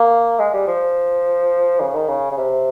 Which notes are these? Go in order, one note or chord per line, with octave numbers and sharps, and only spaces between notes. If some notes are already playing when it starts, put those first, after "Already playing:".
Already playing: A#3
G#3
G3
F3
C#3
D#3
C#3
C#3
C3